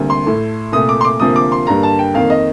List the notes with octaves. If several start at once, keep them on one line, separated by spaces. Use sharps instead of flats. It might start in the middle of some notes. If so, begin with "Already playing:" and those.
Already playing: D2 C3 G3 A#3
C6
A2 A3
C2 A#2 A3 D#6
D6
C6
D6
D2 C3 F3 A#3 D#6
D6
C6
G2 D3 G3 A#3 A#5
A5
G5
F2 D#3 A#3 F5
D#5